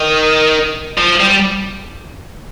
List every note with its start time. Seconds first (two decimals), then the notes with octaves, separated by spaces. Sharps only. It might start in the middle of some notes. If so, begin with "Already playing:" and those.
Already playing: D#3
0.98 F3
1.20 G3